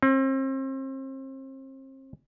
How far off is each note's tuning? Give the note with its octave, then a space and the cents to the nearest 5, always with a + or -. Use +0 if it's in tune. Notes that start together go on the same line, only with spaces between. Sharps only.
C4 +35